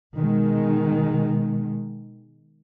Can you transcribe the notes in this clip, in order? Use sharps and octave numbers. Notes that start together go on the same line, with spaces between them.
B2 D#3 G#3